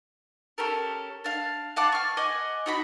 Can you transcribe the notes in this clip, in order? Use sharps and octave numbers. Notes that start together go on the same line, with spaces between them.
C#4 G4 A4 A#4
D4 F5
F5 F#5 A5 D6
C#6 F6
D#5 F#5 G#5 D6
D#4 F#4 B5